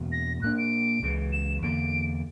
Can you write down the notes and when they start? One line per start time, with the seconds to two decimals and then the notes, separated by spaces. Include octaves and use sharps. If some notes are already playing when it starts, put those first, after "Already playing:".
Already playing: E2 B2 A#3
0.12 A#6
0.42 A#2 A#3 D4 F#6
0.58 D7
1.02 C#2 C#3 E3
1.32 E7
1.62 E2 D3 A#3 D7